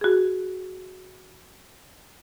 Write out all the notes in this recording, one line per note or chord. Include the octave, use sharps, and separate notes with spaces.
F#4 G#4